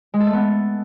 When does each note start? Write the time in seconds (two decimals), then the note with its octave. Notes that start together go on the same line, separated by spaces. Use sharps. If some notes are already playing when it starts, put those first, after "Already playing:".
0.14 G#3
0.20 A4
0.27 A3
0.33 B3